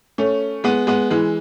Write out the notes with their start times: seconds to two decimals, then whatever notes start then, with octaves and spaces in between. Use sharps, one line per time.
0.18 A3 C#4
0.64 G#3 B3
0.87 G#3 B3
1.11 E3 G#3